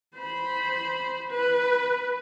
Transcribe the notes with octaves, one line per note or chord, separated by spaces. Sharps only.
C5 B5
B4